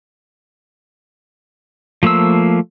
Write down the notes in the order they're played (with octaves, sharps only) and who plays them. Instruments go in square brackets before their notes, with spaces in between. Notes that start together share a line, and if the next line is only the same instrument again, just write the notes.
[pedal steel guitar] F3 A3 A#3 C5 E6